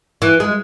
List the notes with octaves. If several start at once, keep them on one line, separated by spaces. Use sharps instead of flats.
E3
G#3